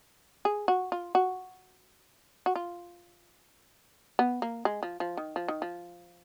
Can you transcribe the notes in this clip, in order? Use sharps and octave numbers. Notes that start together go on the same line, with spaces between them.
G#4
F#4
F4
F#4
F#4
F4
B3
A#3
G#3
F3
F3
D#3
F3
D#3
F3